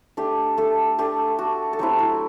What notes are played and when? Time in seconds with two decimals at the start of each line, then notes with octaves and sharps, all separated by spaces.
0.17 A3 D4 G4
0.58 A3 A4
0.98 A3 D4 G4
1.39 F#4
1.73 A4
1.79 F#3 A3 C4 E4 G4
1.99 F#4